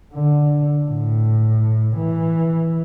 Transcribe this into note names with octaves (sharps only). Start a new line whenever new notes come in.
D3
A2
E3